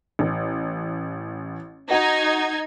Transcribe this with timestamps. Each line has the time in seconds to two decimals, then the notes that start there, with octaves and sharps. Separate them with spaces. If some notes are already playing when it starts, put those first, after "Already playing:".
0.19 A1
1.91 D#4 F#4 G#6